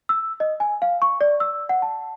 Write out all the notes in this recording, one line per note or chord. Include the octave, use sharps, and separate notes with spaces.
E6
D#5
G#5
F5
C#6
D5
E6
F#5
A5